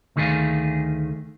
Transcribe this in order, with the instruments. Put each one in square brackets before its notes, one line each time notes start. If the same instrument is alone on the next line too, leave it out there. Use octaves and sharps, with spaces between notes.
[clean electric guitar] D2 D#3 A3 G#4 D5 F5